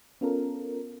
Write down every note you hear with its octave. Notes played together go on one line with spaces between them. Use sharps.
B3 C#4 F4 A4 A#4